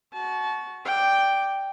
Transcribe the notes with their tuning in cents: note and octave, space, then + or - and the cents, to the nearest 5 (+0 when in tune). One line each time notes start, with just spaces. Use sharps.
F#4 +0 A5 -30
D5 +0 G5 +0